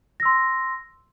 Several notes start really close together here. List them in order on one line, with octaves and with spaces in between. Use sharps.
A#6 E6 C6